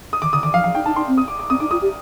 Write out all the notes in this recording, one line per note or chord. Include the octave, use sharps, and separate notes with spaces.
D#6
D#3 D6
D3 D#6
D#3 D6
F3 F5
F3 F5
D#4 G5
D#4 A5
D#4 C6
C4
D#6
D6
D6
C4 D#6
D#4 D6
F4 D#6
G4